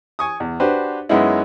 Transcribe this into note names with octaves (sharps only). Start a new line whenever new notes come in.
G#5 C#6 D#6
E2
D4 F#4 G4 B4 C5
F#2 G#3 B3 C#4 D#4 E4